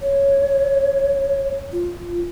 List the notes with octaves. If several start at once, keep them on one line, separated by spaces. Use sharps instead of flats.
C#5
F4